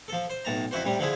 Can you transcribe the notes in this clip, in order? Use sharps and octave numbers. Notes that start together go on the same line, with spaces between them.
F3 A4
C5
B1 A2 A5 A#5
F2 E4 F#4 C5
A2 C3 G3
D3 F3 E4 G#4